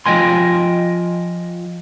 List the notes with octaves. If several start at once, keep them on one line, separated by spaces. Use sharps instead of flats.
F3 D#5 G5 G#5 C6